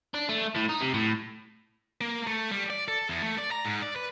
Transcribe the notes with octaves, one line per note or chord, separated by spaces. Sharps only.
D4
A3
A2
D#4
C3
A2
A#3
A3
G3
D5
A4
E2
A3
D5
A#5
G#2
D5
B4